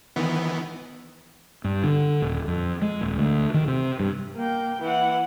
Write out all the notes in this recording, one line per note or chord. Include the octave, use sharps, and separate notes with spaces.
D#3 E3 B3
G2
D3
D#1
F2
G#3
D#1
D2
D#3
C3
G2
A#3 G5
E3 F#5